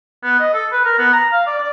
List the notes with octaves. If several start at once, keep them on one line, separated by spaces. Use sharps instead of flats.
B3
D#5
A4
B4
A#4
B3
A#5
F5
D5
D5